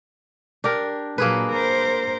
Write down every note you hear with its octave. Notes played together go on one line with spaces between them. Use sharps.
D4 G4 A#4
A#2 F#3 A#3 G#4 B4
A#4 C5